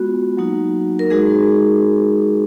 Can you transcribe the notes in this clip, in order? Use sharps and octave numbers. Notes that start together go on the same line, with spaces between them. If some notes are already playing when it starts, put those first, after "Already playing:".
Already playing: G#3 B3 F4 F#4
F#3 A#3 D#4 F#4
A#4
G#3 D#4 F#4 G#4